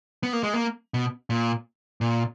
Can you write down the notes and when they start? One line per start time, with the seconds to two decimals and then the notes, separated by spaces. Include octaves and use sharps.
0.23 B3
0.33 A#3
0.43 G#3
0.54 A#3
0.94 B2
1.30 A#2
2.01 A#2